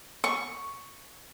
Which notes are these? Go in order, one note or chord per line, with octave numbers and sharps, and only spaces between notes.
C#6